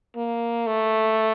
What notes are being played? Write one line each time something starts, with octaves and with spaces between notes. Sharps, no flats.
A#3
A3